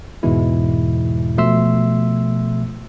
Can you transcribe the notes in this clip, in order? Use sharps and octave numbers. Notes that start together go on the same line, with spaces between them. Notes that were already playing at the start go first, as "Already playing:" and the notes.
E2 G#2 B2 E3 G#3 E4
B2 F3 A3 E5 C6 E6